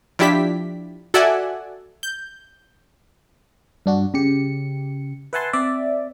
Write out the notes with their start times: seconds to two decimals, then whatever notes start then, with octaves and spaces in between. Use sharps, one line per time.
0.19 F3 D4 E4 G4 D5 B6
1.14 F#4 A4 D5 E5 F#5 G#5
2.03 G6
3.86 G2 D4 F#4
4.14 C#3 G4 C#7
5.33 B4 E5 F#5 G#5 A5 C6
5.53 C4 D5 E5